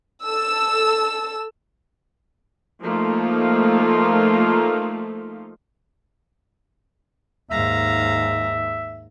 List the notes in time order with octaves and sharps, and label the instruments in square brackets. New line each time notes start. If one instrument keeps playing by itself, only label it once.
[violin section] A4 E6
[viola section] F3 A3 A#3 D#4 F4
[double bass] D#2 G#2 [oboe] E5 [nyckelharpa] F5 A#5